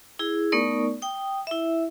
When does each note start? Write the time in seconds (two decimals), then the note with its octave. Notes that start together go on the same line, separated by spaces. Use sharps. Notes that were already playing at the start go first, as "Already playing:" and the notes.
0.19 E4 G#4
0.52 A3 B3 D#4 A#4 D5 C#6
1.02 G5 D#6
1.47 E4 E5